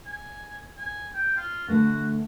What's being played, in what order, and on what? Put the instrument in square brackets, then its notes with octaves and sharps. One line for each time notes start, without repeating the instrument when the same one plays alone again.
[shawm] G#5
G#5
G5
F4
[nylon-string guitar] D3 A3 [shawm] F#4